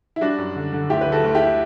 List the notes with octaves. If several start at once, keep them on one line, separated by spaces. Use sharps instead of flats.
E4
G3 D4 F#4
F#2
D3
D3
D2 E4 G4
B4
D2
F#4 A4
D2
E4 G4